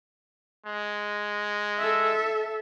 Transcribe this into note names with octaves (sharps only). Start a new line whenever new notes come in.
G#3
A4 E5